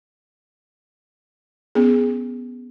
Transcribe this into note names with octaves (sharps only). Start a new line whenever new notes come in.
B3 C#4 G#4